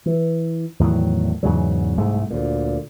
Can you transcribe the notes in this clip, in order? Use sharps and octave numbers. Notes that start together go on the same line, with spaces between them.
E3
E2 A2 D#3 F#3
E2 G#2 C#3 F#3
C2 G#2 G#3 A3
D2 A#2